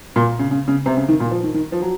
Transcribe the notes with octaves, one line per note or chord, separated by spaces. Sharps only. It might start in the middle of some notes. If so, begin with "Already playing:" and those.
A#2
C#3
C#3
C#3
C3
C#3
D#3
A#2
F3
D#3
D#3
F3
F#3